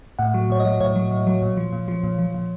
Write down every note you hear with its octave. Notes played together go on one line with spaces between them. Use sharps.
A2 F#5
F#3
A2 C#5
D#5
F#3
A2 C#5
F#3
A2
F#3
A#2
F3
A#2
F3
A#2
F3
A#2